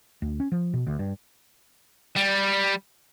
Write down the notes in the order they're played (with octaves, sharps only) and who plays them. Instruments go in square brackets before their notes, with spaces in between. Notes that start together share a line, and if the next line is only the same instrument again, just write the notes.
[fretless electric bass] D2
C#4
F3
B2
D2
G2
[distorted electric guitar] G3